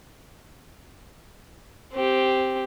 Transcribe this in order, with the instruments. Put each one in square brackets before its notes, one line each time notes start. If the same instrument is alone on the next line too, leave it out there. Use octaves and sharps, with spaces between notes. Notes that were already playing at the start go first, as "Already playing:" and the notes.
[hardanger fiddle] C4 G4